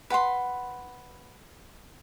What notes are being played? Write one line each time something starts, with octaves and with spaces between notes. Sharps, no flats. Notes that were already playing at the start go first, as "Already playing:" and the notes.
B4 F#5 B5 C6